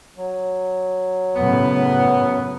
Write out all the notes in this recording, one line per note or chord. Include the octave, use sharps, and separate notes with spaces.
F#3
F#2 A2 C#3 B3